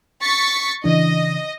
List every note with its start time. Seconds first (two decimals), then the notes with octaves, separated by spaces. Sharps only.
0.21 C#6 A6 B6
0.84 C#3 E3 D4 D#5